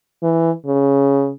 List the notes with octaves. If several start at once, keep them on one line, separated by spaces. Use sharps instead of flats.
E3
C#3